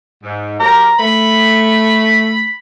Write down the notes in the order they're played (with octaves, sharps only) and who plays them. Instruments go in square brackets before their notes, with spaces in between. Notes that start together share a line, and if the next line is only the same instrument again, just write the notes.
[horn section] G#2
[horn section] F#3 G4 A#4 [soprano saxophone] A#5
[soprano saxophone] A3 [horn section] B5